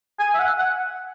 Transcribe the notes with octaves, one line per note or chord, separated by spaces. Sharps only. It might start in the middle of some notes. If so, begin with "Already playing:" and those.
G#5
E5
F#5
F#5